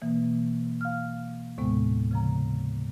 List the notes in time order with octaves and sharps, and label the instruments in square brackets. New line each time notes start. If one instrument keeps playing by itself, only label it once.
[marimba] B2 E3 A#3
F5 F6
D#2 A2 C3 G#3 B3
C#3 F3 A#5